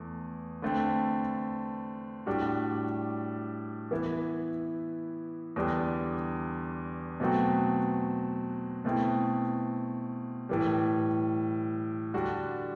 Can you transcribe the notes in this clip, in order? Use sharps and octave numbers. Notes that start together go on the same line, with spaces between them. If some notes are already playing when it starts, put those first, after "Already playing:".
Already playing: E2 A3
D3 A3 C4
A2 G3 D4 F#4
E3 B3 E4
E2 D3 G3 D4
B2 F#3 A3 C4 F#4
B2 A3 C4 E4
A2 E3 G3
D3 G3 D4 F#4